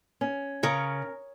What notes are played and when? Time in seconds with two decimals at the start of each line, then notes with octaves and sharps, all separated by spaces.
0.21 C#4
0.63 C#3 A#4 C#5